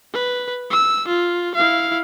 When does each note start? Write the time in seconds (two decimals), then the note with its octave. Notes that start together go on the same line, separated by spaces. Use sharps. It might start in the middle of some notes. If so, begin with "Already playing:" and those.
0.13 B4
0.71 E6
1.08 F4
1.55 E4 F5